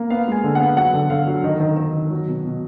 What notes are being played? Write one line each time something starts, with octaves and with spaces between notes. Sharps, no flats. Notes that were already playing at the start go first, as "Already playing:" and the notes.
Already playing: A#3
B3 F5
G#3 G#5
D3
B3 F#5
F#3 F#5
D3
D3 F5
F#3
D#3 D#5
D#3
D#3
D#3
F#3
B2
B2